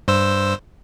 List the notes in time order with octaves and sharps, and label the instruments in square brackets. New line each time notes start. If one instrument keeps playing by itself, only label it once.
[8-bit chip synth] G2 C5 E6